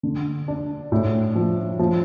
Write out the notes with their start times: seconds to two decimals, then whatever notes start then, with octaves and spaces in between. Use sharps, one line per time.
0.03 D3
0.48 D4
0.92 A2
1.35 F3
1.79 F3